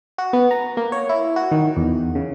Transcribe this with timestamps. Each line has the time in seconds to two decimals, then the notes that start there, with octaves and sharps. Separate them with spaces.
0.18 F#4
0.33 B3
0.51 A#5
0.77 A#3
0.92 C#5
1.09 E4
1.36 F#4
1.51 D#3
1.77 E2
2.15 C#3